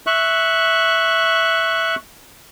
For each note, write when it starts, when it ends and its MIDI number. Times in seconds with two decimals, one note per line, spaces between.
0.07 1.96 76
0.07 1.96 85
0.07 1.96 90